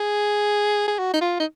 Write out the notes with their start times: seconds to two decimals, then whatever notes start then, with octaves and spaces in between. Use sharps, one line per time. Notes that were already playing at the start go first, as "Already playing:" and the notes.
Already playing: G#4
0.88 G#4
0.98 F#4
1.13 D#4
1.21 F4
1.40 D#4